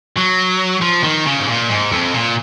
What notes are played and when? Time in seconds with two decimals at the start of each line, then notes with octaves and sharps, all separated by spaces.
0.16 F#3
0.82 F3
1.04 D#3
1.26 C#3
1.40 G#2
1.48 A#2
1.69 G#2
1.92 F2
2.14 A#2